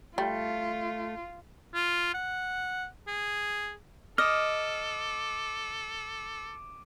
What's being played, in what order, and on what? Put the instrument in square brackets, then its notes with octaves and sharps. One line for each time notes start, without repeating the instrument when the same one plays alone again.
[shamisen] G3 [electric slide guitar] A3 [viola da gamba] F4
[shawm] F4
F#5
G#4
[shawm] A4 [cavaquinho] D#5 [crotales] D6 D7 D#7 [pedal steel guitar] F6